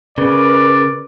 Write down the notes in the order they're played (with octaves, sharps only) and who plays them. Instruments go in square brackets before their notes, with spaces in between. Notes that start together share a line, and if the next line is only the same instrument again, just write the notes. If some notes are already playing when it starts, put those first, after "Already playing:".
[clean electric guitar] C#3 [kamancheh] A#4 B4 [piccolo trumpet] D5